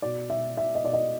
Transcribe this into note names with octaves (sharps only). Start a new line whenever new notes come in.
B2 D5
B2 E5
B2 E5
D#5
B2 D5
D#5